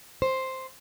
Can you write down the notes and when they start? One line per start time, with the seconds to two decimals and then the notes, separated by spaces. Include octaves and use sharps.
0.22 C5